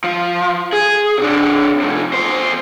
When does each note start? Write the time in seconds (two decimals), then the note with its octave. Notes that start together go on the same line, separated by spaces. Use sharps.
0.04 F3
0.73 G#4
1.18 C3 D4
1.80 C3 F3
2.13 E2 C5